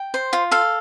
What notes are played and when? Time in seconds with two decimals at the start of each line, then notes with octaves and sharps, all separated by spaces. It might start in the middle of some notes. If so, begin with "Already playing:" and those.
Already playing: G5
0.14 C5
0.33 F4
0.51 A4 F5